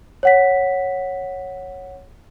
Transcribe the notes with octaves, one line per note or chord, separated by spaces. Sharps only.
C#5 F#5 B6